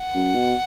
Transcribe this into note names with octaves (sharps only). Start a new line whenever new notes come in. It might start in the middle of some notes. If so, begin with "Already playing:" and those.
Already playing: F#5
F#2
B2